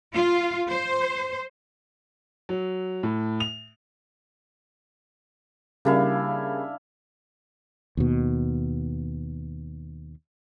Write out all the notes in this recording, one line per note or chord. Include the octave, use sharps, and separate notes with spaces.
F4
C5
F#3
A2
F7
C#3 G3 A#3 D4 E4 F5
D#2 B2